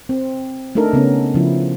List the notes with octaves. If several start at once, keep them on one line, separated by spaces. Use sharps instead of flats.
C4
A3 D4 D#4 A4 A#4
C#3 B3 C#4
C#3 F3 E4